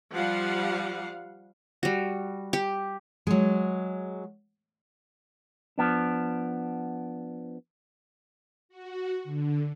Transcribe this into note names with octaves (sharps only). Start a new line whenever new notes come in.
F3 G3 F5 F#5
G3 F#4
G4
F#3 G#3
F3 B3 D4
F#4
D3